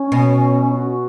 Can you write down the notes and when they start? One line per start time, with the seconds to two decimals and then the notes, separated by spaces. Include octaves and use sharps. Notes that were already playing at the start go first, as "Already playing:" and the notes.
Already playing: C#4
0.12 B2
0.71 F#4